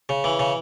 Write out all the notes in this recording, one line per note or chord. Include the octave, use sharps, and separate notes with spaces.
C#3
E3
C#3